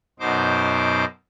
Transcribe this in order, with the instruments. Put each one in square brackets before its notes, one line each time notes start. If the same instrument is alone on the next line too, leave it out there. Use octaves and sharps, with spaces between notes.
[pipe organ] F#2 B2 D#4 C5 D6